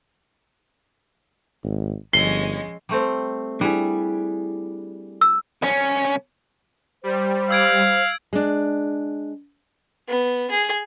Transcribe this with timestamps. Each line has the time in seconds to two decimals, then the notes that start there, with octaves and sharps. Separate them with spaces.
1.64 G#1
2.13 G1 F3 G#3 C#4 C7 G7
2.89 G3 A3 C4
3.61 G3 D4 E4 G#4
5.21 E6
5.62 C2 C#4
7.04 G3 C5
7.51 F5 E6 G#6 D7
8.33 G#3 D4
10.08 B3
10.51 G#4